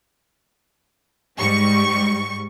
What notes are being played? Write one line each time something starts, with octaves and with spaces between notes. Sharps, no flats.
G#2 G3 C#6